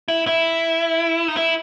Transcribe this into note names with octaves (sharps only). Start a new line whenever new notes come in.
E4
E4
D#4
E4